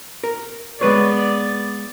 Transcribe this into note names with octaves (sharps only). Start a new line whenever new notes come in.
A#4
G#3 B3 B4 C#5 D5